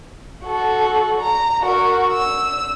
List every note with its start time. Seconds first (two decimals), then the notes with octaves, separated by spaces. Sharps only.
0.46 F#4 A4
1.21 A#5
1.62 F#4 A#4
2.13 E6